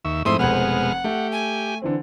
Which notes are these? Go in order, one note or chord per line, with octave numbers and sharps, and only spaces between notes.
D#2 E5 C#6
F2 G#2 A3 C4 E4 C6 D#6
F1 B2 G#3 C5 F#5 B5 F6
A3 G4
G#5
D3 E3 C4